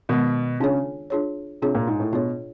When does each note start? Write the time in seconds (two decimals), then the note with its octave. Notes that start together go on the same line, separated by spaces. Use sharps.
0.09 B2 D#3 G#3 B3
0.60 C#3 D4 F4 G#4 C#5
1.10 D4 F4 G#4 C#5
1.62 C3 D4 F4 G#4 C#5
1.75 A#2
1.87 G#2
2.00 A2
2.12 B2 D4 F4 G#4 C#5